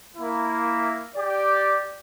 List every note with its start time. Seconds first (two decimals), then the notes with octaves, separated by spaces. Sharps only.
0.17 A#3 E4
1.16 G4 D5